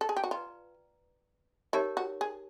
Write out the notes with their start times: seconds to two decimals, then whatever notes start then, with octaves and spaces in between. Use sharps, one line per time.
0.01 A4
0.09 G#4
0.16 G4
0.24 F#4
0.31 F4 B4 D5 G5 A#5
1.73 D#4 E4 G4 A#4 C#5
1.97 F#4
2.21 G#4